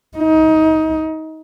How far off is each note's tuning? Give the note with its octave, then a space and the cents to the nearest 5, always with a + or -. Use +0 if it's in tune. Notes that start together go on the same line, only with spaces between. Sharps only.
D#4 +25